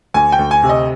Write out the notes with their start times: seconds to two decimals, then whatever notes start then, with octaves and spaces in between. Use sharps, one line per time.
0.14 D2 G#5
0.32 G5
0.39 D2
0.51 G#5
0.63 C3
0.69 D#5